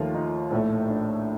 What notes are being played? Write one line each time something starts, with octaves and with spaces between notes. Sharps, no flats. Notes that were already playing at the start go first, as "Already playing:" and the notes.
Already playing: D#2 D#3 F3 A3 F4
D#4
A#1 A2 A3
D4